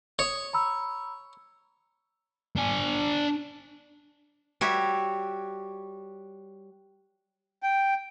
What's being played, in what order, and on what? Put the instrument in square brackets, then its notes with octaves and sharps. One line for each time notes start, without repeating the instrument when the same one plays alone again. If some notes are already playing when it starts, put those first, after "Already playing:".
[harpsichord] C#5 [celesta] C#6 D#6
[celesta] A#5 B5 E6
[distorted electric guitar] D4 G#5
[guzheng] G3 F#4 C#5 E5
[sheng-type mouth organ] G5